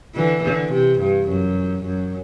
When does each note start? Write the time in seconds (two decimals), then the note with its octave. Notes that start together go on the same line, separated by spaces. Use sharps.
0.15 D3 E3
0.44 D3
0.72 C3
1.00 G2
1.27 F#2
1.85 F#2